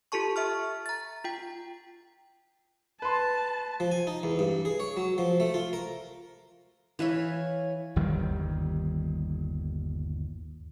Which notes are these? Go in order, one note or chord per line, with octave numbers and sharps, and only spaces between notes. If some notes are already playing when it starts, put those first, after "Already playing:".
F4 G4 A4 A5 C#6
E5 C#6 F6
A#5 A6
F4 G5
B4 A5 C6
F3
G#5
D#4
E2
G2
G#4
C#5
F#3
F3
A3
F4
A#4
E3 B4 C#5 E5 F5
G1 D#2 D#3 G3